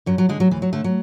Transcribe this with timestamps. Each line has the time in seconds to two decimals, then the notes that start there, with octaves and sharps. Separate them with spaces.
0.06 F#2 F#3
0.18 F#3
0.29 D3 G#3
0.40 F#3
0.51 D2 E3
0.62 F#3
0.73 D3 A3
0.84 F#3